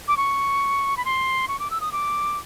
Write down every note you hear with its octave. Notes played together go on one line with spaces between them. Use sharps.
D6
C#6
B5
C6
C#6
D6
E6
D#6
D6